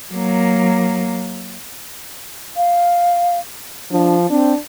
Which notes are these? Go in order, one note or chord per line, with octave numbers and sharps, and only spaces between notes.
F#3 A#3
F5
F3 D4
C4 D4